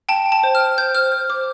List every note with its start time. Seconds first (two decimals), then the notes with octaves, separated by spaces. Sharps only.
0.09 G5 A5
0.26 G5
0.32 A5
0.43 C5
0.55 F6
0.60 G5
0.78 C5 G6
0.95 C5 F6
1.12 C5
1.30 C5 D6